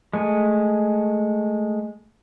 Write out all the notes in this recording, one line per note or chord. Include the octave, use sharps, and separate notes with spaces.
G#3 A3 G#5